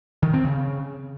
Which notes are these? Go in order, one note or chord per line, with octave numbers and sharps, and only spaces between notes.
D#3
C4
C#3